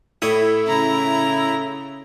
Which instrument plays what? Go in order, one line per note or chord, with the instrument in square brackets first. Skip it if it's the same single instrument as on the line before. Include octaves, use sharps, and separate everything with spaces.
[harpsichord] A2 C#5 D#6 [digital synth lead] E4
[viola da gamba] C#3 [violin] A#5